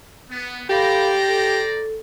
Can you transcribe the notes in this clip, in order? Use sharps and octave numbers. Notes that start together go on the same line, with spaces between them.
B3
G4 A4 C5 D5 F5 A#5 B5
A4